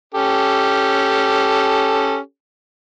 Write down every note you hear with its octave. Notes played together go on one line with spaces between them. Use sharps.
C#4 G4 A4